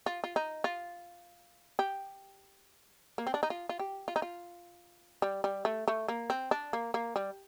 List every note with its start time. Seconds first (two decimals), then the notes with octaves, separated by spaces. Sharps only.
0.06 F4
0.24 F4
0.36 D#4
0.64 F4
1.79 G4
3.18 A#3
3.27 C4
3.34 D4
3.43 D#4
3.50 F4
3.69 F4
3.79 G4
4.08 F4
4.16 D#4
4.22 F4
5.22 G3
5.44 G3
5.65 A3
5.88 A3
6.08 A#3
6.30 C4
6.51 D4
6.73 A#3
6.94 A#3
7.16 G3